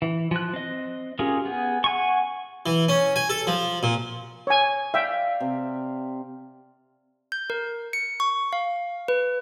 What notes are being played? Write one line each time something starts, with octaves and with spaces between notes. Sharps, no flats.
E3
F3 F#6
C4 D#5
C#4 F4 G4 G#4 A#4
B3 G#4
F#5 G#5 C#6
E3
C#4
G#5
A4
F3
A#2
C#5 G#5
D5 E5 F5 G5
C3
G6
A#4
C#7
C#6
F5
B4